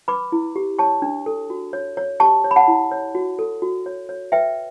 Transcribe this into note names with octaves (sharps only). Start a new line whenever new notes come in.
B4 B5 D6
E4
G4
C#5 A5 C#6
D4
A4
F#4
C#5
C#5
G4 A5 C#6
C#5
B5
F#5 A5
E4
C#5
F#4
A4
F#4
C#5
C#5
B4 E5 G5